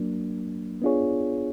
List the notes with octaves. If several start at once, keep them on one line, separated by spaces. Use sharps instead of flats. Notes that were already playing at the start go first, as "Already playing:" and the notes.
Already playing: F#3 A#3 D4
B3 D4 F4 G#4 C#5